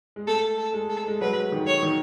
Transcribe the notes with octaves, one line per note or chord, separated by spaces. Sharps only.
G#3
A3 A4
A4
G#3
A4
G#3
F#3 B4
D#3
C#5
D#3